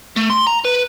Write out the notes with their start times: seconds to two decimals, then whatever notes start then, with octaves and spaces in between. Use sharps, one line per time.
0.16 A3
0.30 C6
0.47 A#5
0.65 B4